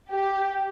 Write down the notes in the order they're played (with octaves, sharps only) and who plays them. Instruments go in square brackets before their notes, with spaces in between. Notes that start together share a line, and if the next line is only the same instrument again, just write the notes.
[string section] G4